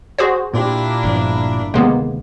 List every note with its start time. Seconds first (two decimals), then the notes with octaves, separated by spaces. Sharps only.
0.19 F#4 G#4 C5
0.54 A#2 A#3 D4 E4 G4
1.03 G1 G2 F3
1.74 D2 C3 D#3 G#3 A#3 B3